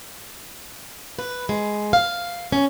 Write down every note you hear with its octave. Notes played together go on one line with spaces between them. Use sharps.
B4
G#3
F5
C#4